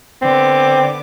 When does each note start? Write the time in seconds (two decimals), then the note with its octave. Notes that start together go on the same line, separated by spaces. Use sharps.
0.22 D3 B3 C4 D6